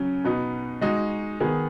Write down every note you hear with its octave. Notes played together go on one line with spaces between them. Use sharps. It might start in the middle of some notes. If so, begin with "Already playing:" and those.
Already playing: C#3 F#3 C#4
B2 B3 D#4
G#3 D#4 F#4
D#3 B3 D#4 G#4